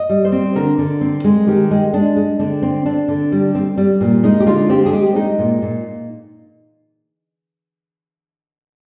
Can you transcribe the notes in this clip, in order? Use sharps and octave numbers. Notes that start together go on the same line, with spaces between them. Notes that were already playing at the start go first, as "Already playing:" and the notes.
Already playing: D#5
G3
C5
C4
D3 A#4
D3
C4
G#3
D#3 G4
G#3
G#3 D4
G#3
D3 C4
C4
C4 D4
D3
G3
C4
G3
A#2
G#3 D#4
G4
D3 F4
C4 G4
G#4
G#3 G4
G#3 D#4
A#2
A#2